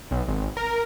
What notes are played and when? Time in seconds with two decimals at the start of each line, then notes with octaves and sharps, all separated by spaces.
0.11 B1
0.28 G#1
0.57 A#4